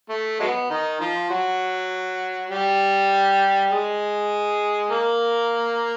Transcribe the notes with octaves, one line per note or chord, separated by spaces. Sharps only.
A3
F#3 G#3 B3
D#3 D#4
F3 F4
F#3 F#4
G3 G4
G#3 G#4
A#3 A#4